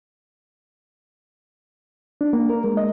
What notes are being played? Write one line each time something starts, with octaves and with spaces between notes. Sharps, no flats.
D4
A#3
A#4
G#3
D#5